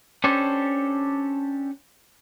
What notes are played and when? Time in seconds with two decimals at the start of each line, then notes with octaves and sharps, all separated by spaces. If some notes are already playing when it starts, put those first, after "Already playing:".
0.24 C#4 D4 G4 A4 C5 C#5